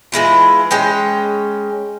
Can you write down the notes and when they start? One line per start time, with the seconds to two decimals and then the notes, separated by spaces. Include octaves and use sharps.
0.12 E3 G#3 E4 F4
0.71 G#3 C#4 G5